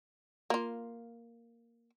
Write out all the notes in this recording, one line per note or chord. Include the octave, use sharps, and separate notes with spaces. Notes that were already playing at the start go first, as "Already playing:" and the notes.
A#3 F4